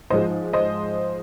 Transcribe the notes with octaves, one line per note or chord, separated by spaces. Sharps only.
G#2 F3 G#3 C5 D#5
C5 D#5